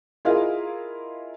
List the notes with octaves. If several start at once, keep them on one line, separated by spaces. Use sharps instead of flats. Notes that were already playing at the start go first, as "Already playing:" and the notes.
E4 F4 G#4 A#4 D#5 F5